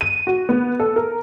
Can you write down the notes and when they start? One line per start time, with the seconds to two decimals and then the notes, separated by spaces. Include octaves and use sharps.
0.01 D#7
0.27 F#4
0.49 B3
0.80 A4
0.96 A#4